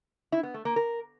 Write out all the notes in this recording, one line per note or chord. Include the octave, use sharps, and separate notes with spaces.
E4
B3
A3
A#3
A#4